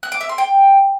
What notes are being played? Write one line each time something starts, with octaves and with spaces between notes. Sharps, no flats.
F#6
D6
E5
C6
G5